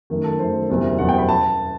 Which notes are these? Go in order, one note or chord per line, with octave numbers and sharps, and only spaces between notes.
F#2 D#3 A3
A4
F#2 D#3 A3 C5
F#1 E2 B2 G3 C4
F#1 E2 B2 G3 C4 F#5
G5
B5
A5